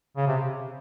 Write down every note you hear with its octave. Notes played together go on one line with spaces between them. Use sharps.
C#3
C3